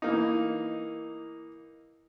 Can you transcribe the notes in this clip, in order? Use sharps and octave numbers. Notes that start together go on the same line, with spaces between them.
E3 A#3 D#4